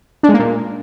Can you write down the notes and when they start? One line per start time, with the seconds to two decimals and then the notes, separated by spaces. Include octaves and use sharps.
0.23 D4
0.29 G#3
0.34 A#3
0.39 A#2